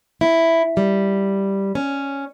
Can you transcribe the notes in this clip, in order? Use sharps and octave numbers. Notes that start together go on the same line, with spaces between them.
E4
G3
C#4